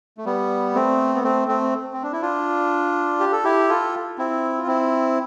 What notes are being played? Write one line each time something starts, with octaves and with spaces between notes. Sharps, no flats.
A3
G3 B3
A3 C4
B3
A3 C4
A3 C4
C4
D4
E4
D4 F4
G4
A4
E4 G4
F4 A4
C4 E4
F4
C4 E4